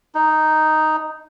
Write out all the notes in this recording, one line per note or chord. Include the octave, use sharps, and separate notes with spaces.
D#4